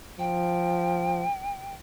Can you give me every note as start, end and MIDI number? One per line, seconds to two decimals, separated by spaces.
0.19 1.24 53
0.19 1.75 79